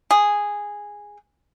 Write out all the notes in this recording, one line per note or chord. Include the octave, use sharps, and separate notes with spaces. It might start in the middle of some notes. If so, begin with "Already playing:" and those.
G#4